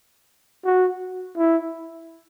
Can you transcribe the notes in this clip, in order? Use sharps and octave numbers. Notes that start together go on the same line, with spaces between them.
F#4
E4